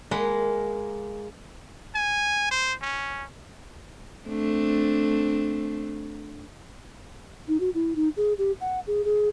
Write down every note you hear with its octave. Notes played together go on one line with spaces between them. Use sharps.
G#3 A#3 D#5 F#5 B5
G#5
C5
C#4
A3 C4 D4
D#4
F#4
E4
D#4
G#4
G4
F#5
G#4
G#4